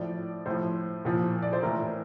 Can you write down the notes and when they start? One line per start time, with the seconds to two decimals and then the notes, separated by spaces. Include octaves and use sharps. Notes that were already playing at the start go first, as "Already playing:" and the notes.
Already playing: A2 F3 D5
0.46 A2 F3 C5
1.05 A#2 F3
1.42 D5
1.53 C5
1.63 A2 E3 A#4